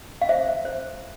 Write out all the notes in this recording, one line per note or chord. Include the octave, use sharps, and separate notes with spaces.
F5
C5 E5
C5